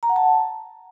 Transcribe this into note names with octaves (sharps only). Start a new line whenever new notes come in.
A#5
F#5
A5